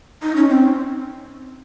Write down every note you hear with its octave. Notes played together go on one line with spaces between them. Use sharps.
D#4
C#4
C4